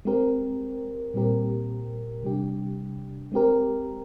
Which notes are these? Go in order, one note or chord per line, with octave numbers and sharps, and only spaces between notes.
G#3 C4 G4 A#4
A#2 G3 C4 G4 A#4
C3 G3 D4 G4
G#3 C4 G4 A#4